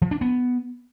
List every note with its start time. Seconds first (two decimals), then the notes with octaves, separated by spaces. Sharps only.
0.02 F3
0.11 D4
0.21 B3